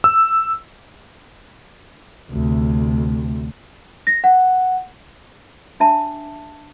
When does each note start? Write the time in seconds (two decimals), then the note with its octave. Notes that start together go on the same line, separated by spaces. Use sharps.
0.04 E6
2.31 D2 C3
4.07 A#6
4.24 F#5
5.80 D4 E5 A5